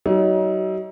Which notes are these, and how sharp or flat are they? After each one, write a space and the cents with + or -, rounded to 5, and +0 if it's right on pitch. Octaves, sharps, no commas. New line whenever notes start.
F#3 +40 D#4 +30